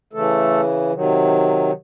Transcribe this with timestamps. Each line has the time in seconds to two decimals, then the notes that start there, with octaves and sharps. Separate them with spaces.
0.13 C#3 E3 A3 A4
0.93 C3 D#3 F#3